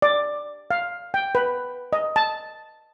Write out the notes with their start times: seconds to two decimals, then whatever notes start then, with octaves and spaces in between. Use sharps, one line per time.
0.02 D5
0.71 F5
1.14 G5
1.35 B4
1.93 D#5
2.16 A5